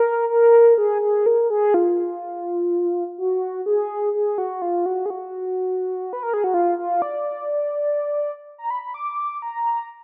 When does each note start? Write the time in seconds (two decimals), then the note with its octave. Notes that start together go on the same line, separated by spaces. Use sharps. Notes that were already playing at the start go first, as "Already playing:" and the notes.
Already playing: A#4
0.30 A#4
0.78 G#4
1.02 G#4
1.26 A#4
1.50 G#4
1.74 F4
3.18 F#4
3.66 G#4
4.14 G#4
4.38 F#4
4.62 F4
4.86 F#4
5.06 G#4
5.10 F#4
6.13 B4
6.23 A#4
6.34 G#4
6.44 F#4
6.54 F4
6.78 F4
7.02 D5
8.58 A#5
8.70 B5
8.82 B5
8.94 D6
9.42 A#5